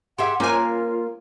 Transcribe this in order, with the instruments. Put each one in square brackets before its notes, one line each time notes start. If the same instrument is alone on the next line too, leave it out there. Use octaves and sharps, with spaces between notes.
[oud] G4 G#4 E5 [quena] F#5 [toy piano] C6
[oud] A#3 [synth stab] C#4 G#5 [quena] F4 [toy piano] C5 C#5 D6